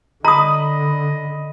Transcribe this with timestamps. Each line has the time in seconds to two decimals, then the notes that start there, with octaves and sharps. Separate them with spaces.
0.25 D3 D#5 A#5 B5 D#6